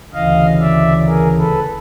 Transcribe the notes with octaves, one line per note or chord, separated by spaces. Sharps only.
D2 C#3 E3 D#5 F5
D5 E5
G#4 A#4
A4 B4